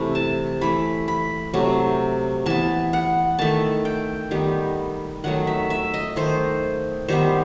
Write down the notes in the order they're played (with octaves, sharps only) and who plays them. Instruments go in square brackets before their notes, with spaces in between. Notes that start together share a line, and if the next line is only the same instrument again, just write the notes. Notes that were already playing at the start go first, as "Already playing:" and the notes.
Already playing: [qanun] C3 E3 A3 B5
A5
E3 A3 B5
B5
C3 F#3 A3
E3 B3 A5
F#5
D#3 A3 A5
G5
D#3 G3 B3
D#3 F#3 A3 F#5
E5
E5
D#5
D#3 A3 C5
D#3 G3 B3 C5